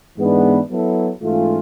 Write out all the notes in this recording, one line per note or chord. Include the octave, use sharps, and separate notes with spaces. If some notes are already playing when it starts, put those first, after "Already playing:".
G#2 E3 G#3 B3 D4
F#3 B3 E4 A4
G#2 E3 A3 C#4 F4